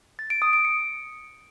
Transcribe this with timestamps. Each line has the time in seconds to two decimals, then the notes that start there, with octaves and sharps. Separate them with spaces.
0.19 A6
0.30 D7
0.42 D#6
0.53 D7
0.65 C#7